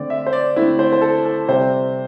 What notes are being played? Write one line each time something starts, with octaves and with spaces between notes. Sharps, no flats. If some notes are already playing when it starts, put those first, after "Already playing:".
Already playing: D3 A3 C4 D5
E5
C5
D5
D3 A3 C4 E4
C5
C5
A4
A4
C3 G3 C4 C5